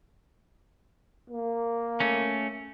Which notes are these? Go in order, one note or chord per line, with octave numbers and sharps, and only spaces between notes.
A#3
A3 C#4